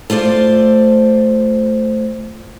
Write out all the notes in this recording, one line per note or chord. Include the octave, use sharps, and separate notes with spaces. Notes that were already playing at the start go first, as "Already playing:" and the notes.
A3 F4 C5 D5